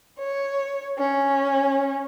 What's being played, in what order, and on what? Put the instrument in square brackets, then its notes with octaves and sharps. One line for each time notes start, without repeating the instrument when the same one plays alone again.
[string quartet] C#5
C#4